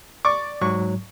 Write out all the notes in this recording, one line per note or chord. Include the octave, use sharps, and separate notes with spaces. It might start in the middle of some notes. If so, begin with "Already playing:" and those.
D5 C#6 D6
G#2 F#3 C#6